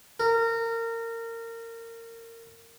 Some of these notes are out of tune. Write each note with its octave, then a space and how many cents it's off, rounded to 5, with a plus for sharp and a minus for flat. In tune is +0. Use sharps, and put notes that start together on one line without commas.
A#4 -25